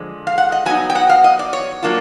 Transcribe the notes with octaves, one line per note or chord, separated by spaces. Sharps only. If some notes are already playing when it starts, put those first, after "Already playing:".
Already playing: D3 F3 G#3
F5
F#5
D#5
F#3 B3 D#4 G#5
G5
F#5
F5
D#5
D5
C#5
F#3 A#3 D4 F4